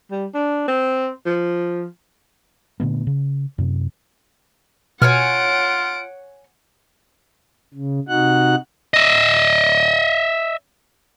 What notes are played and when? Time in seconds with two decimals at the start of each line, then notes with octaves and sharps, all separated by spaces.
0.11 G3
0.34 D4
0.68 C4
1.26 F3
2.80 A#2 D3 A3 B3
3.07 C#3
3.58 F#2 C3
5.02 B2 F4 C#5 F#5 G#5 F6 D7
7.74 C#3
8.08 C3 D#4 F#4 F#5 F#6
8.94 D#5 E5